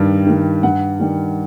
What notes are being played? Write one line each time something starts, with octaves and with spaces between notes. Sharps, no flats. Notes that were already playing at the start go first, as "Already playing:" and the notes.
Already playing: G2 D#3 G3
D#3 G3
G2 F#5
D#3 G3